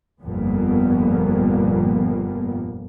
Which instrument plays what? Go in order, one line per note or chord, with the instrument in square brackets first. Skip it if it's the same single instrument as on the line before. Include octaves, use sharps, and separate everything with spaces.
[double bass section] G1 F2 A#2 F3 A#3 B3